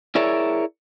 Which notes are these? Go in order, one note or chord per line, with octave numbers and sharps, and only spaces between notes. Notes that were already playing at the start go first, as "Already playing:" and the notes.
E4 G#4 A#4 C#5 D5 E5